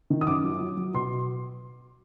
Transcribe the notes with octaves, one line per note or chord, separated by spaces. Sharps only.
D#3
D#6
F#2 D6
F#3
F#3
F#3
B2 C6